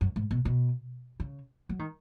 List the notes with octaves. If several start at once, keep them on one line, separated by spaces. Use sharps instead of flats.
F#2
G#2
B2
B2
C#3
F#3
D#3